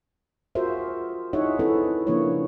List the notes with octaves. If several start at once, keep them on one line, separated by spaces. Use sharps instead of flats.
F4 F#4 G#4 A#4 C5 E5
D#4 E4 G#4 C#5 E5 F#5
C4 E4 G#4 A4 B4
C#3 F3 A#3 D4 E4 C#5